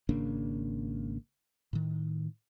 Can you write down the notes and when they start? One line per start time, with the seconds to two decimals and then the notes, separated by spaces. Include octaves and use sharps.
0.09 G#1 C#3 A#3 D4
1.73 A2 D#3